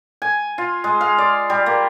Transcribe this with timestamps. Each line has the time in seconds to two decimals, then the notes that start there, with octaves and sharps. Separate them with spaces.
0.22 G#5
0.58 F4
0.84 G#3
1.01 F5
1.18 D5
1.50 G3
1.66 A#3